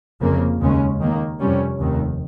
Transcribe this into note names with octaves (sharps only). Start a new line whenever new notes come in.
F1 F2 C#3 F3 A#3
D#2 C#3 G#3 C#4
D#2 D#3 A#3
F2 C3 G3 C#4
F1 D#2 D#3